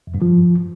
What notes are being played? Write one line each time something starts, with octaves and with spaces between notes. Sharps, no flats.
F2
G2
F3